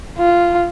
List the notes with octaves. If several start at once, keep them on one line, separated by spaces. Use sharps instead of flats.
F4